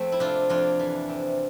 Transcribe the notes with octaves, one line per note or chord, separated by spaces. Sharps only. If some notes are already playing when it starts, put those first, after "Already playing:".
Already playing: F2 A3 C4
E4
C3 D4 F4
F2 D4 F4
E3
C3